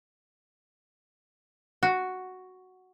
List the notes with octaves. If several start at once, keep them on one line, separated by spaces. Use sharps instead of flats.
F#4